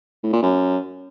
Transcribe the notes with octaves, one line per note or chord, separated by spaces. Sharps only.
A2
A#2
F#2